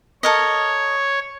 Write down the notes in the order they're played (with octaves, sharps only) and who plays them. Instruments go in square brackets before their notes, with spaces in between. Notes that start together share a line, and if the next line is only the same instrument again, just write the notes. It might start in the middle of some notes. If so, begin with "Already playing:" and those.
[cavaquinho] A4 A#4 D#5 [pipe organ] C#5